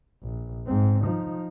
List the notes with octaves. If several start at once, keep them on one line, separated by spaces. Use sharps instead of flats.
A#1
G#2 C4
F3 D#4